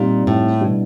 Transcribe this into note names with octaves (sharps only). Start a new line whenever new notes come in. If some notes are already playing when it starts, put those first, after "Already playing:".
Already playing: A#2 G3 C4 D#4 G4
A2
B2 G3 B3 D4 F#4